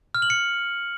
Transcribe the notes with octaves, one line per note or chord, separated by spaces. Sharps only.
F6
F#7
C#7